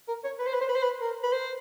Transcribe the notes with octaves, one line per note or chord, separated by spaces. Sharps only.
A#4
C#5
B4
C5
B4
C5
B4
C5
B4
A#4
B4
C5